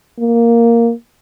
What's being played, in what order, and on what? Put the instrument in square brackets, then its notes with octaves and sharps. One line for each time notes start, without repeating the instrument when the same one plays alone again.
[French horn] A#3